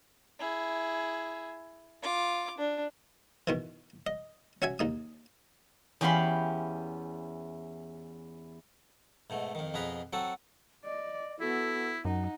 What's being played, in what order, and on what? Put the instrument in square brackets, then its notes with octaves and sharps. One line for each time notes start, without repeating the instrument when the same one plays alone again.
[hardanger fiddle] E4 G#4
F4 D6
D4
[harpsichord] B2 D#3 E3
D#5
C#4 F#4 E5 G#5
D#2 D#4 D#6
[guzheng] E2 C#4 G4 F5 B5 C6
[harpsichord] G#2 B2 A3
F2 D#3
F2 B2 G#4 B4 A#5
F#3 C4 F#4 A4
[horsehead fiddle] D5 [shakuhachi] D#5
[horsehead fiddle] B3 F#4 [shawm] E4 [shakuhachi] A4
[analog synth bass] F#2 [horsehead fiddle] D#4 [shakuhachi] F#5